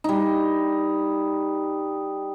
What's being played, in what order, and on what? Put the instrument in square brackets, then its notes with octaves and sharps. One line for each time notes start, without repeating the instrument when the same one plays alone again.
[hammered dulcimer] G3 D#4